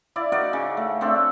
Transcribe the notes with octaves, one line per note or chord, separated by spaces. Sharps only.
E4 D5 F5
D#4 F#4 A#4 D5
C#3
A3
A3 C4 D4 A4